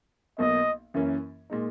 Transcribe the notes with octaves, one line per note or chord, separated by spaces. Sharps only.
B1 B2 A#3 D#5
F#2 E3 A#3 C#4
A#2 G#3 D#4